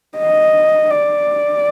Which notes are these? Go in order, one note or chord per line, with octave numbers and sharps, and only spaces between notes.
D#5
D5